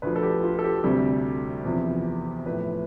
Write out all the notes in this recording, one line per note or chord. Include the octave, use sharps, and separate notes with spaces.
D2 D3 F3 B4
A4
G4
F4
A4
G4
D2 C3 G3
E2 C3 F3
A2 F3 B4